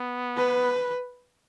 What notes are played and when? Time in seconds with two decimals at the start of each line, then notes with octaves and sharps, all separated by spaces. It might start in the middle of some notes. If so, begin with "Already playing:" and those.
Already playing: B3
0.37 B4